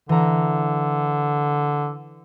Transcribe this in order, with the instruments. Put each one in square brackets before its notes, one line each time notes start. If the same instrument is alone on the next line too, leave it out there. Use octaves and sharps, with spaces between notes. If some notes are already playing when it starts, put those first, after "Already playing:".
[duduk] D3 [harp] E3 A#5